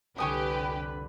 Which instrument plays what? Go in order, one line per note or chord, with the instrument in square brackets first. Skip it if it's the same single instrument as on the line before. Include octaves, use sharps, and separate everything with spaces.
[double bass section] C2 F2 D3 [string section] G4 [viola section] B4 [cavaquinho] C#5 G#5 D#6